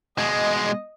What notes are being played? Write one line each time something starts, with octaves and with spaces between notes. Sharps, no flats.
B2 G#3 D#5